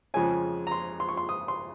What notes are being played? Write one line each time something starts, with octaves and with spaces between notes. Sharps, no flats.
F2 C#3 F3 G#3 C#4 G#5
A#5
C6
C6
C#6
C6
D#6
C6